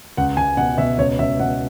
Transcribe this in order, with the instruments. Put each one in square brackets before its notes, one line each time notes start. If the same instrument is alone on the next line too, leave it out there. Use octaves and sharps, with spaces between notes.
[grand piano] C#2 F#5
C#2 G#5
B2 F#5
B2 E5
C#2 C#5
C#2 E5
B2 F#5